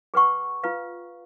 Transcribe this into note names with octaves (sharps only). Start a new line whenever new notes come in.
G#4 B4 F#5 C#6
F4 B4 F5